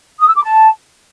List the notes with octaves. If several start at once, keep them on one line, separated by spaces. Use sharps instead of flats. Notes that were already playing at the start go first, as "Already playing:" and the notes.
D#6
E6
D6
A5